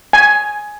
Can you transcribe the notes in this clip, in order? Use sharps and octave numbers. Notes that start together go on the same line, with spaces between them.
G#5